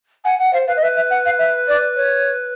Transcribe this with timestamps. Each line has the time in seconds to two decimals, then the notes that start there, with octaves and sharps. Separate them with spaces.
0.24 F#5 G#5
0.39 F#5
0.53 C5 F5
0.67 B4 F5
0.76 D#5
0.82 B4 E5
0.96 E5
1.10 F#5
1.25 F5
1.38 E5
1.68 D5
1.96 C#5